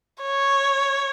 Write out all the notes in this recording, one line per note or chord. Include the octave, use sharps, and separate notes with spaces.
C#5